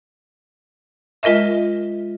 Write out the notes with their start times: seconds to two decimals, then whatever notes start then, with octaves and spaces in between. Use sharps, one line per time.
1.23 G#3 F4 A#4 D#5 E5